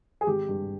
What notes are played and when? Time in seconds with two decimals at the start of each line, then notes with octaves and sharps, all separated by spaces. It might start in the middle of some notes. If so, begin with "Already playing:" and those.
0.21 G#4
0.27 G#1 G4
0.49 G2